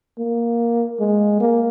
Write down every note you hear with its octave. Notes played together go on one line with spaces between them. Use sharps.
A#3
G#3
A#3